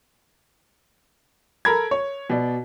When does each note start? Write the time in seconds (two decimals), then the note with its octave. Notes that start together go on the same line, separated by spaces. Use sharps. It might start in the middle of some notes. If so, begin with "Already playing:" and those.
1.65 A4 A#4 A#5 B5 G#6
1.91 C#5
2.30 B2 D5